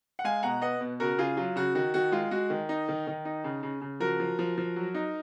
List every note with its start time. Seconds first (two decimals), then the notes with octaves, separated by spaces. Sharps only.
0.19 F#5
0.24 G#3 F5 G#5
0.43 B2 F#5 A#5
0.62 B3 D#5 F#5
0.81 B2
1.00 C#3 F#4 A#4
1.18 C#3 F4 G#4
1.37 F#3 F4
1.56 C#3 F#4
1.75 D#3 F#4
1.94 D#3 F#4
2.12 G#3 F4
2.31 G#3 F#4
2.50 D#3
2.69 D#4
2.88 D#3
3.07 D#3
3.25 D#4
3.44 C#3
3.63 C#3
3.81 C#3
4.00 F3 F#4 A#4
4.20 F3
4.39 F3
4.57 F3
4.76 F#3
4.94 D#4